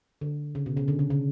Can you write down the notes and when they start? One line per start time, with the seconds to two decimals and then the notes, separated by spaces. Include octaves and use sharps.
0.21 D3
0.55 C#3
0.66 B2
0.77 C#3
0.88 D3
0.99 C#3
1.10 C#3